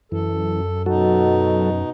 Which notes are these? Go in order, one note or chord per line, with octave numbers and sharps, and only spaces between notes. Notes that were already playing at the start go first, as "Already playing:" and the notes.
F#2 E3 A4
B2 F#3 D#4 F#4 A4